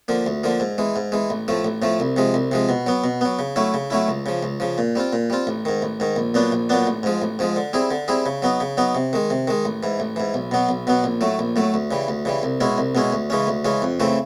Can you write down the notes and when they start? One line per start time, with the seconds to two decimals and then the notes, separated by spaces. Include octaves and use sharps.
0.08 D3 F3 A#3
0.26 D2
0.44 D3 F3 A#3
0.60 G#2
0.78 E3 G#3
0.96 G#2
1.12 E3 G#3
1.30 A1
1.48 A2 F3 A3
1.65 A1
1.82 A2 F3 A3
2.00 C2
2.16 C3 F3 G#3
2.34 C2
2.52 C3 F3 G#3
2.69 B2
2.86 F#3 B3
3.04 B2
3.21 F#3 B3
3.39 C#3
3.56 F#3 A3 C#4 E4
3.74 C#3
3.90 F#3 A3 C#4 E4
4.08 C#2
4.26 C#3 F3
4.43 C#2
4.60 C#3 F3
4.78 A#2
4.95 G3 C4 F4
5.13 A#2
5.30 G3 C4 F4
5.47 A1
5.65 G#2 D#3
5.82 A1
6.00 G#2 D#3
6.16 A#1
6.34 A#2 F#3 B3 D4
6.52 A#1
6.69 A#2 F#3 B3 D4
6.87 A1
7.03 G#2 F3 G#3
7.22 A1
7.39 G#2 F3 G#3
7.56 D3
7.73 G3 C4 E4 G#4
7.91 D3
8.08 G3 C4 E4 G#4
8.26 C#3
8.42 F#3 B3 D#4
8.60 C#3
8.77 F#3 B3 D#4
8.95 C3
9.13 D#3 G#3
9.30 C3
9.47 D#3 G#3
9.65 A1
9.83 G#2 E3
10.00 A1
10.16 G#2 E3
10.34 B1
10.51 B2 F#3 B3
10.69 B1
10.87 B2 F#3 B3
11.04 A#1
11.21 A2 F#3 A3
11.39 A#1
11.56 A2 F#3 A3
11.74 D2
11.91 C#3 E3 G3
12.08 D2
12.25 C#3 E3 G3
12.43 C2
12.60 B2 G#3 C#4 E4
12.78 C2
12.95 B2 G#3 C#4 E4
13.12 D2
13.30 C#3 E3 G#3 C#4
13.47 D2
13.65 C#3 E3 G#3 C#4
13.82 F2
14.00 C#3 E3 A3 C4